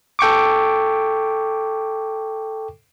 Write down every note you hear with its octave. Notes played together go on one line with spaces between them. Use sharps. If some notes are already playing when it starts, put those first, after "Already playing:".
A4 G5 C#6 D6